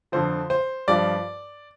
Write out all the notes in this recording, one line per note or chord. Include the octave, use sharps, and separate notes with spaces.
F2 D3 F3 C5
C5
G2 F3 D5